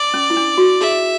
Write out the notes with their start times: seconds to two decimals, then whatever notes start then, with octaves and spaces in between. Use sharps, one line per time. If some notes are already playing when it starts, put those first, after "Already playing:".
Already playing: D5
0.14 C#4
0.30 E4
0.37 D4
0.58 F#4
0.80 G#4 E5